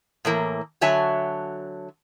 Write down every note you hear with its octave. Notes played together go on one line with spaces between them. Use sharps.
A2 E3 A#3
D3 F#3 C#5 E5 G#5 A5